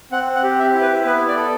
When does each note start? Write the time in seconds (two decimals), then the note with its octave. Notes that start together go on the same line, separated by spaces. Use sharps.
0.12 C4 F#5
0.35 F#5
0.43 G4
0.59 E5
0.73 E4
0.81 B4
1.05 B3 B4
1.28 D5
1.36 A4